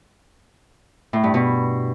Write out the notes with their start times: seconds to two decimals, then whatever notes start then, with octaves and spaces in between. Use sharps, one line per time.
1.13 A2
1.23 G2
1.34 B2